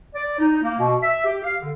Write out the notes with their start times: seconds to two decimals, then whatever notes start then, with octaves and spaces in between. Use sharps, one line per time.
0.15 D5
0.39 D#4
0.63 A#3
0.79 B2
1.02 E5
1.25 G4
1.44 F5
1.61 D3